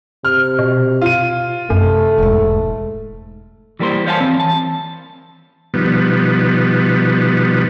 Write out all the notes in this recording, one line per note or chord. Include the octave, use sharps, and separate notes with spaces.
C3 F6
B2
F4 D#7
F#2 C3 A3
E1 G#2
E3 G3 A#3 A#4 C5
C5 C#5 F5 G#5 A5
E3 C4
A5
B2 D#3 F3 G3 B3